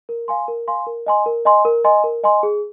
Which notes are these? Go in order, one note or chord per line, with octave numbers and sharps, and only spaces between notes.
A#4
F5 G#5 C6
A#4
F5 G#5 C6
A#4
D#5 G#5 C6
A#4
D#5 G#5 C6
A#4
D#5 G#5 C6
A#4
D#5 G#5 C6
G#4